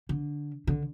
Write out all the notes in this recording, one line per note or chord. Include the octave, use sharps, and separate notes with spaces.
D3
D3